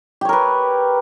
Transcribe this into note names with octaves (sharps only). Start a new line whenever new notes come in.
G4 A#4 B4 C#5